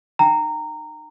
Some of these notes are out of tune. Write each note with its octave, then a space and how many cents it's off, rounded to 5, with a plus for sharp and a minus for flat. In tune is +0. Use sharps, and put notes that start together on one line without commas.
D#4 -35 G5 +0 A#5 -15